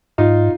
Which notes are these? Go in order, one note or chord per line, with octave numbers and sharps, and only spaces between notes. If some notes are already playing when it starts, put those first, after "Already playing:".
G#2 D#4 F4